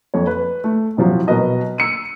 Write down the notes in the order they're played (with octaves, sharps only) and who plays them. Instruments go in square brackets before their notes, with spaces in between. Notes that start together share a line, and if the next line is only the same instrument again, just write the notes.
[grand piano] F2 C#5
B4
A3
A2 C3 F3 F#3
B2 F#3 A#4 B4 D#5 A5
E6 C#7 D#7